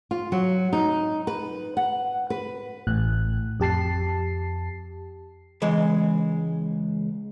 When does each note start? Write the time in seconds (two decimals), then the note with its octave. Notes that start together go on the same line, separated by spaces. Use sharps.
0.11 F4
0.32 F#3
0.73 D#4
1.27 B4
1.77 F#5
2.30 B4
2.87 A1 A2 F#6
3.60 F2 G4 A5 C7
5.62 C#2 E3 G#3